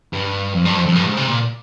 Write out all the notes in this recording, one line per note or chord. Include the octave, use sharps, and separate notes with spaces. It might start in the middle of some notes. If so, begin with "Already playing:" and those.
G2
F2
G2
F2
F2
G2
G#2
C3
A#2